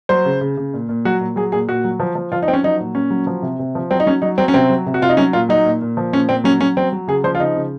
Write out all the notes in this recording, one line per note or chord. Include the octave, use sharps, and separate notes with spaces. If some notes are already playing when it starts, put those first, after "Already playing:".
F#3 C5
C#3
C#3
C#3
A#2
A#2
F#3 F#4
A#2
F#3 G#4
A#2 G#4
A#2 F#4
F#3
F3
F3
F3 F4
D#4
F3 C4
C#4
F#3 D#4
A#2
A#2 C#4
F#3
F3
C3
C3
F3
F#3 C4
D#4
F#3 C#4
F#3 D#4
F#3 C4
C#4
C3 C4
F#3
C3
F#4
C3 F4
D#4
F#3 C#4
A#2 F4
F#3 D#4
A#2
A#2
F3
A#2 C#4
A#2 C4
F#3 C#4
F#3 C#4
F#3 C4
F#3
C#3 G#4
F3 C5
F4
C#3 D#4
C#3